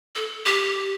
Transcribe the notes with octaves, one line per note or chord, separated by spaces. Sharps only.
A4
G4